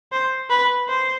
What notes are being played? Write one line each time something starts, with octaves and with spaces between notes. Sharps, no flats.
C5
B4
C5